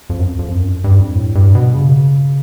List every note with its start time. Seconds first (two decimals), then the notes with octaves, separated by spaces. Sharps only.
0.10 F2
0.19 F#2
0.25 F2
0.39 F2
0.55 F#2
0.84 G2
1.00 F2
1.15 A2
1.35 G2
1.55 B2
1.75 C#3